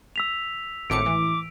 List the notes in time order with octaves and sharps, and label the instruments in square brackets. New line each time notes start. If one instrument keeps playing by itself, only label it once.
[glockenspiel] E6 B6 F7
[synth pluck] G#1 A2 C#7 [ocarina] D6 [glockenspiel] D7
[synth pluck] E3